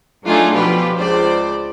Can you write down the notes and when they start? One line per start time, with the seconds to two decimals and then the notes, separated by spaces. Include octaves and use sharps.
0.24 F#3 A3 D4 D#4 F4 G#4
0.54 B2 F3 F4 G4 B4
0.96 C#2 C5 D5